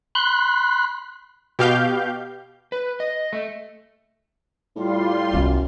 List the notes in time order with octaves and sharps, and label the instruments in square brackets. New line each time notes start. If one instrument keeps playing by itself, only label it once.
[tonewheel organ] B5 C6 F#6
[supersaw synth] B2 G4 F5 G6
[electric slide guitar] B4
D#5
A3
[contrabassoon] A2 [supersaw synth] G3 F4 C6
[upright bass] C2 B3 [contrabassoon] F#2